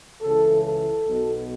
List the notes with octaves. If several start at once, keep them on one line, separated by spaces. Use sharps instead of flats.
C#2 C#3 E3 A4
A4
B1 B2